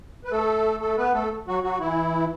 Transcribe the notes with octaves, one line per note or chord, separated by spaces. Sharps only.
B4
A3 A4
A3 A4
B3 B4
A3 A4
F#3 F#4
F#3 F#4
E3 E4